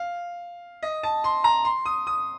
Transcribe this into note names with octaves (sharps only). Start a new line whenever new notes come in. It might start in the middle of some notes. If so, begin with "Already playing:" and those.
Already playing: F5
D#5
A5
C6
A#5
C6
D#6
D#6